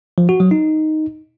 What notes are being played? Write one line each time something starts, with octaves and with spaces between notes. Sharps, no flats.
F3
F#4
F#3
D#4